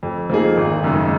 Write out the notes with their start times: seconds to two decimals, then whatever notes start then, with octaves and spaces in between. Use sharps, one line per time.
0.03 F2
0.30 F3 A#3 D#4 G#4
0.57 G#1
0.84 F#2 C#3 G#3 D#4